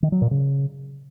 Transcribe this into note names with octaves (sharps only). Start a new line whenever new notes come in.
D#3
F#3
A#2
C#3